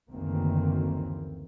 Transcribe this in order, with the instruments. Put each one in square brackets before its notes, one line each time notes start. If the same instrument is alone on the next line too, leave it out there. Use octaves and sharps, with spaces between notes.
[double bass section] F#1 D2 D#3 E3 A#3 C4